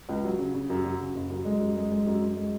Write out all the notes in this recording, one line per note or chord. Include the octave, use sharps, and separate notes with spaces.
C#2
F#3
C#3
C#3
F#2
F#3
C#3
F#1
F#2
G#3
F#2
G#3
G#3
F#2
F#2
G#3